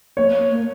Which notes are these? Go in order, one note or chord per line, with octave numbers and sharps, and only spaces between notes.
A#3 C#5
A#3